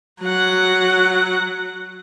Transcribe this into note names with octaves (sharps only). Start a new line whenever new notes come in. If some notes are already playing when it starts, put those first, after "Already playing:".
F#3 F#5